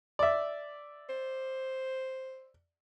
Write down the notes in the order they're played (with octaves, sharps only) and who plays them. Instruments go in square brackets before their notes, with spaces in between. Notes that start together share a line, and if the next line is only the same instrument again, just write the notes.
[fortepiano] D5 E5
[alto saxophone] C5